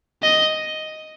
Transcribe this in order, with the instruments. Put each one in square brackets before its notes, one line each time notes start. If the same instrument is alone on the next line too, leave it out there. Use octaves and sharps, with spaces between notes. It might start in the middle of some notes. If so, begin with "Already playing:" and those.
[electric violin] D#5